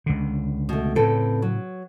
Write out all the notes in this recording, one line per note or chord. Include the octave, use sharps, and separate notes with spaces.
C#2 D3
B2 A3
A2 C#3 C4 A4 B4
F#3